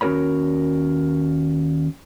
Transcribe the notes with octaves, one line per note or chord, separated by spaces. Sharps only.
D#2 C#4 F#4 A#4 C#5 B5